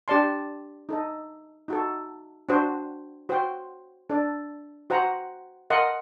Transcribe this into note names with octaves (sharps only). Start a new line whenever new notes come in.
D4 G4 D5 A5 C6
D#4 A4 D#5
D#4 F#4 A4
D4 F#4 C5
F#4 C5 G5 C6
D4 A4 D5
F#4 C5 F#5 A#5
A#4 D#5 F#5 C6